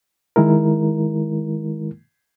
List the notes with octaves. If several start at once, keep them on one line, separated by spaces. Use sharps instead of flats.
D#3 G#3 E4 A#4